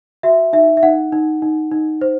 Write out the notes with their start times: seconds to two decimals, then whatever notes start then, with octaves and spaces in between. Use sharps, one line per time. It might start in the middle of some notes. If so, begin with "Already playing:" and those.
0.23 F#4 E5
0.53 D#4 E5
0.77 E5
0.83 D#4 F#5
1.12 D#4
1.42 D#4
1.71 D#4
2.01 C5